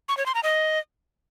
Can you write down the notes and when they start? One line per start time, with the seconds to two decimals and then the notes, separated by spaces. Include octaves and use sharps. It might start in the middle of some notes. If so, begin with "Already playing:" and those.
0.09 C#6
0.17 C#5
0.26 C6
0.35 A#5
0.43 D#5